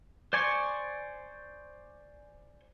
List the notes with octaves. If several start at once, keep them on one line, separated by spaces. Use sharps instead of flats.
C5 D5 G#5 C6 C#6